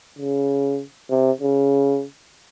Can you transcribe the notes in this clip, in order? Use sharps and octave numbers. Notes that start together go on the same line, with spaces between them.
C#3
C3
C#3